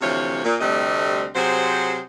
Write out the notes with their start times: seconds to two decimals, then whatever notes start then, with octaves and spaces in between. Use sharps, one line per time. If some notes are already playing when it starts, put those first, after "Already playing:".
0.01 D2 C3 E3 F3 C#5
0.44 A#2
0.60 D2 C3 G3 A3 C4 D#5
1.35 C3 F#3 G#4 C5